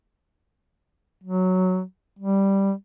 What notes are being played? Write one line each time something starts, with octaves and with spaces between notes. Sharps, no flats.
F#3
G3